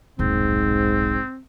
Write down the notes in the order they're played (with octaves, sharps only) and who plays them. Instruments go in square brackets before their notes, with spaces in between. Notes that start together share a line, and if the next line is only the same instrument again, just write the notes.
[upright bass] D#1 B1 [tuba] G#2 [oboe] C4